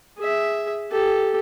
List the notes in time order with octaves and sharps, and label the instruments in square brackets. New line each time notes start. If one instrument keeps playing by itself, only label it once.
[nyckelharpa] G#4 E5
G4 A4